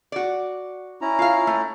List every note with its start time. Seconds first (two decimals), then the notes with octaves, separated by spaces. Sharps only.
0.12 F#4 D5
1.01 C#4 E4 A#5
1.19 F4 F5
1.47 A3